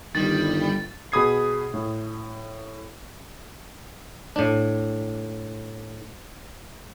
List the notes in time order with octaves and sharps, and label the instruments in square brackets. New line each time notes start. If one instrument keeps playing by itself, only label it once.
[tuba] G1 [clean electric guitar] D#3 [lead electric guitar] G3 [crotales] A6
[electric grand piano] B2 G#4 B5 D#6 G#6 C7
A2
[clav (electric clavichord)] A2 D4